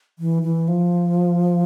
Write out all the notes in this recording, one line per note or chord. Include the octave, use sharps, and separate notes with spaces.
E3
E3
F3